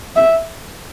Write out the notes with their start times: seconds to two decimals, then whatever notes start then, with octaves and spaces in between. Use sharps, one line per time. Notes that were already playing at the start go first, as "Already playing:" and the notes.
0.16 E5